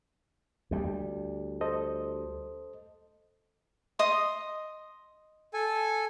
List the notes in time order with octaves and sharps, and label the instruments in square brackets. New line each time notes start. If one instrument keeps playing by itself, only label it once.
[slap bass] D2 G3
[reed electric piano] A4 C5 D#5
[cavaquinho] D#5 C6 D#6
[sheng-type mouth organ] A4 G#5